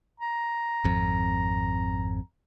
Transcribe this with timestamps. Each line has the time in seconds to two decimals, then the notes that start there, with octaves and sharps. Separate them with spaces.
0.20 A#5
0.84 G#1 F2